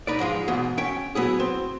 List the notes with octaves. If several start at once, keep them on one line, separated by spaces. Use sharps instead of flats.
D#4 B4 D5
G#2 F3 G#3 F4
E2 G#2 B2
C#4 E5 G5
F#3 B3 E4 G#4
C4